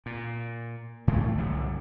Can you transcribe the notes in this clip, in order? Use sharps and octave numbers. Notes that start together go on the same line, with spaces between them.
A#2
A2 D3 E3 A3
C2 F#2 D3